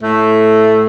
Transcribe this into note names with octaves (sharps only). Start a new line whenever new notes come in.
A2 A3